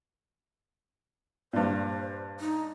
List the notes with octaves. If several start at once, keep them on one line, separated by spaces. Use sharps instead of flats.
G2 A#2 C5
D#4